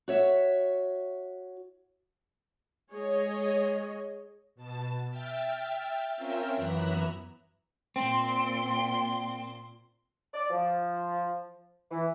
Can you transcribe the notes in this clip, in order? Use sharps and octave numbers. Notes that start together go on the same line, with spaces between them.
F#4 C#5 E5
G#3 G#4 C#5 D#5
B2 A5
E5 G5 F6 A6
C4 C#4 F4 A#4 E5 G5
F#2 E3 B3 E5 A#5 F#6
A#2 C4 C6
D5
F3
E3